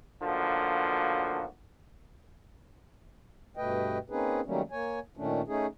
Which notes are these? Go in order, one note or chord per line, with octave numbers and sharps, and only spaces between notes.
B1 D3 F3 A#3 F#4
G2 B2 A3 B4 D#5 G5
A#3 C4 C#4 D#4 G#4 B4
D#3 F#3 G3 A3 A#3 C#4
A#3 C#5 G#5
A#2 D#3 A3 C#4 D4
A3 C#4 D#4 G#4